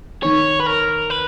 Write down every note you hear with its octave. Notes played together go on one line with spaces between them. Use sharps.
D#3 C#5
B4
A#4
B4